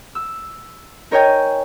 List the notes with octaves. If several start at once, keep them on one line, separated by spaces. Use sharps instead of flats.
E6
D#4 A#4 C#5 D#5 G5 G#5